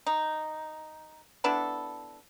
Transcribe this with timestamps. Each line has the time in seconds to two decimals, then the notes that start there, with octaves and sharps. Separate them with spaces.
0.07 D#4
1.44 B3 D4 E4 A4